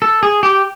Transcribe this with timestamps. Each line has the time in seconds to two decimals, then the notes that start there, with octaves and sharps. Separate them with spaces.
0.02 A4
0.23 G#4
0.43 G4